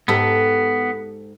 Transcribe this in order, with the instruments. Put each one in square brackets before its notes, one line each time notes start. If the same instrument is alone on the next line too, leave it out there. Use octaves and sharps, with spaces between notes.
[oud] G#2 G4 A4 [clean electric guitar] B3